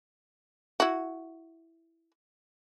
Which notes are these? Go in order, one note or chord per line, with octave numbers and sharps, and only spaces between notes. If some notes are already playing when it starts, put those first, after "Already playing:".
E4 F#4